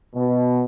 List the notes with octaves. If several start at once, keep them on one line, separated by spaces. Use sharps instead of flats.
B2